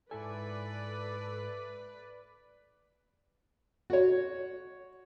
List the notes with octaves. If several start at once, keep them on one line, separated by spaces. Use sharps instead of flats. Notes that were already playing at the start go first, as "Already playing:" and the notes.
G#2 E4 A4 B4 D5 G#5
F#4 C#5